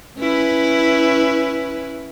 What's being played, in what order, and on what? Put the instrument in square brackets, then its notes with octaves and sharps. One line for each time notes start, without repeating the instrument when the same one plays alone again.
[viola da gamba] C#4 E4 B4